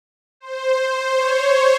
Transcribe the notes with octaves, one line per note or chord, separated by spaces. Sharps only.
C5
C5
C#5